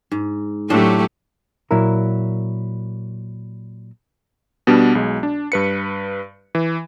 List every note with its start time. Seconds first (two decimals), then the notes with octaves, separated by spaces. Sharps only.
0.12 G#2
0.70 A2 F#3 A3 D4 G4 C5
1.71 A#2 F#3 E4 A#4
4.67 B2 G3 B3 D4
4.95 B1 G#3
5.23 D4
5.52 G2 B4 C#7
6.55 E3